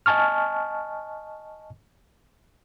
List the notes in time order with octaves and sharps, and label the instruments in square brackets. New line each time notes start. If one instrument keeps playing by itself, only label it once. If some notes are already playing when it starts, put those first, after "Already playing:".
[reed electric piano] D#5 G#5 A5 C#6 F6